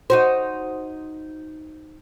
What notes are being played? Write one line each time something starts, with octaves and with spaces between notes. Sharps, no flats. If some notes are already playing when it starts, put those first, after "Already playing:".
D#4 F#4 C5